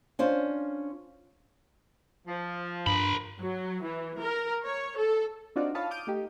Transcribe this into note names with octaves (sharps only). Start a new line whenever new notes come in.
C#4 D4 F4 C5
F3
G2 A#4 B5
F#3
E3
A#4
C#5
A4
C4 D4 D#4 F4 F#4 D5
F4 C#5 F5 A5 B5 D#6
D6 D#6 F6 G6 D7 D#7
A3 D#4 G4